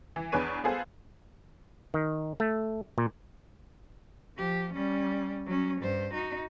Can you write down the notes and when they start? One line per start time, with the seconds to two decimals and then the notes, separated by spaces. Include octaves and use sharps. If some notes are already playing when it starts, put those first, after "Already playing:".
0.16 E3
0.32 E2 D4 G#4 B4 C#5 D#7
0.64 B3 F4 G#4 A4 C5
1.94 D#3
2.40 A3
2.98 A#2
4.36 F3 G4
4.73 G3 C#4
5.46 F#3 C#4
5.81 G2 C5
6.13 D#4 F#4